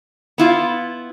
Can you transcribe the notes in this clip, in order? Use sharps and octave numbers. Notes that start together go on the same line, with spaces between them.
B3 E4 F4